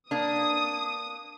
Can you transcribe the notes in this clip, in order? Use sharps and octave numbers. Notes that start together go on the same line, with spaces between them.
A#3 D4 D#6